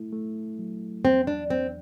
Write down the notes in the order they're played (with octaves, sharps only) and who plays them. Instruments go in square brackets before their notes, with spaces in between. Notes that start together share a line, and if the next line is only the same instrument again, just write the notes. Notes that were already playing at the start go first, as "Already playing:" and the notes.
Already playing: [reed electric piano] A3 E4
A3
F#3
[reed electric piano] E2 [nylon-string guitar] C4
[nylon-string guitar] D4
[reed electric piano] E2 [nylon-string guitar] C4